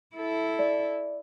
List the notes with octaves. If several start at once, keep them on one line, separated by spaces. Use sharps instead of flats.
E4 A4
D5